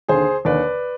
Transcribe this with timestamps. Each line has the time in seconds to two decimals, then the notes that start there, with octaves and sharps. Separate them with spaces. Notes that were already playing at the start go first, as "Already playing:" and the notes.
0.08 D#2 D3 G#4 C5
0.45 D#2 D3 B4 D5